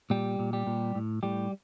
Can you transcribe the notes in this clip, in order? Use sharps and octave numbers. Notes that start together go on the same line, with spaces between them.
A#2 G3 G4
A#2
G3 G4
A#2
A2
A2 G3 G4